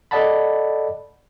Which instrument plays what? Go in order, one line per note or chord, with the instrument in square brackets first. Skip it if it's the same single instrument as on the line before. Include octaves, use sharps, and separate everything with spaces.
[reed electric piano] A4 D5 D#5 F#5 A5 B5